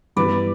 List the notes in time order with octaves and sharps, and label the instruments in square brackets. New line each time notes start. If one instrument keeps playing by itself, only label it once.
[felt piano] G2 E3 B3 E4 G4 [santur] B4 D5